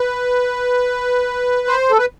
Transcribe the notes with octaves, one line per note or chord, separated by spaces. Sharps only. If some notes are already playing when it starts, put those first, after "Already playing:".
Already playing: B4
C5
A4
B4